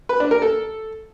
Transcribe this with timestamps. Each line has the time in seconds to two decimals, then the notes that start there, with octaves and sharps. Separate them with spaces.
0.09 B4
0.20 D4
0.31 A#4
0.42 A4